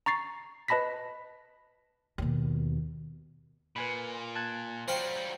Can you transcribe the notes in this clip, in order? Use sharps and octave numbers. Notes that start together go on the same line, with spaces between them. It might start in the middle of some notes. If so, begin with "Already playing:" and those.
A#5 C#6 A6 C7
B4 D#5 A5 B5 A#6 B6
D#2 B2
A#2 B4 G#5 B5
A5 F#6 G#6
F#3 G3 C5 F5 G5